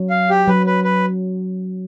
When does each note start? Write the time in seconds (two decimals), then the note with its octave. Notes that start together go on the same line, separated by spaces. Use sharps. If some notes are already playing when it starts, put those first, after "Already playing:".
Already playing: F#3
0.10 F5
0.30 G4
0.47 F#3 B4
0.66 B4
0.84 B4